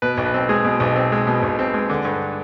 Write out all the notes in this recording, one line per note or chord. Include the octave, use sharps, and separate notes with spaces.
B2 B4
B1
B4
C4
G#3 G#4
B2
B1
C4
G#3
B2
B1
C4
G#3
D3
G2